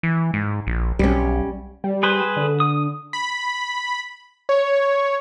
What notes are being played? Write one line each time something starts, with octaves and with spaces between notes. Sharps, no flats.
E3
G#2
A#1
B1 G3 C#4
G3
G#4 B4 C5
D3
D#6
B5
C#5